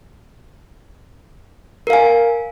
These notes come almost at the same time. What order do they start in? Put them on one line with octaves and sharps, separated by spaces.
A#4 F5 G#5